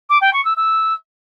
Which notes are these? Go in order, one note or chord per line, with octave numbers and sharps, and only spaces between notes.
D6
G5
C#6
E6
E6